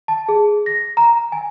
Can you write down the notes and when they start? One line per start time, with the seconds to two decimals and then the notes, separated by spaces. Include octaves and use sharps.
0.08 A5
0.29 G#4
0.66 A#6
0.97 A#5
1.32 G#5